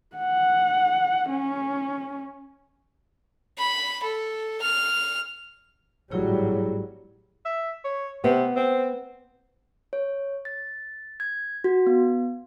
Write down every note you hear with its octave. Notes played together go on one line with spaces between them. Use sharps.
F#5
C#4
B5
A4
F6
G#1 A2 F#3 G3 E4 G#4 C#5
E5
C#5
C3 B3
C4
C#5
A6
G#6
F#4
B3